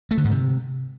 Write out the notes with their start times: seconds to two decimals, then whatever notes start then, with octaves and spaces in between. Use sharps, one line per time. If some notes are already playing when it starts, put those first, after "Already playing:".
0.11 A3
0.18 D3
0.24 G#2
0.31 C3